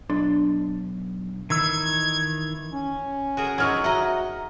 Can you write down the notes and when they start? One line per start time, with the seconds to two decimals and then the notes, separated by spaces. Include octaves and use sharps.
0.10 B1 D4 C6
1.50 D#3 E3 E6 G#6
2.72 C#4
3.37 F#4 G#4 A#4
3.58 F#3 D#4 E5 C#6 F6 G#6
3.84 F#4 D#5 E5 F#5 A#5